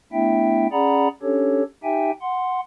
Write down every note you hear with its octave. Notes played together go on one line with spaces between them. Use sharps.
A3 B3 D4 E4 E5 G5
C#4 G#4 D5 F#5 A#5 B5
C#4 D4 G4 A4 C#5
D#4 G4 E5 G5 G#5
F#5 C6